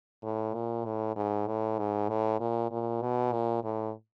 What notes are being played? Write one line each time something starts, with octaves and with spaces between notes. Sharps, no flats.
A2
A#2
A2
G#2
A2
G#2
A2
A#2
A#2
B2
A#2
A2